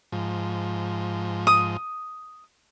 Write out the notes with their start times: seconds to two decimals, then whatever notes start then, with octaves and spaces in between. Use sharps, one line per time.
0.12 G#2 F3
1.47 D#6